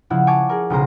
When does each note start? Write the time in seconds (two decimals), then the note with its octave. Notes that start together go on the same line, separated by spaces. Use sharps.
0.10 C#3 F3 E4 F#5
0.27 C#5 G#5 A5 D6 G#6
0.49 G#4 A#4
0.70 B1 C#3 C5 A#5